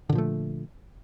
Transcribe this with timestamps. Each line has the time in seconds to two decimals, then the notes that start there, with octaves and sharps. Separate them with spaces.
0.09 D3
0.12 A#2
0.15 F3
0.18 A3